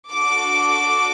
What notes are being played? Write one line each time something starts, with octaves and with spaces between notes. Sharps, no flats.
D4 F#4 A4 D6